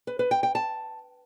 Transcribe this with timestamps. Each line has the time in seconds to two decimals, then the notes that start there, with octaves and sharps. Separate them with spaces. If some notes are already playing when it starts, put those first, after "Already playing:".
0.07 B4
0.19 B4
0.31 G5
0.43 G5
0.55 A5